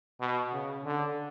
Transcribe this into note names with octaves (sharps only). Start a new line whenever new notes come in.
B2
C#3
D3